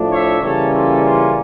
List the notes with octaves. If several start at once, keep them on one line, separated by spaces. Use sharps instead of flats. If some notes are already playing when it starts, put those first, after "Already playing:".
Already playing: A2 F3 A3 D4
C#5 E5
C#3 E3 G3 A#3 C#4 A4 C#5
F4 A4
F4